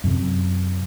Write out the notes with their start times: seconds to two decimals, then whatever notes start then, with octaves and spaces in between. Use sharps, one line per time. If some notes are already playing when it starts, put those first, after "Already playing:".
0.04 F#2 C3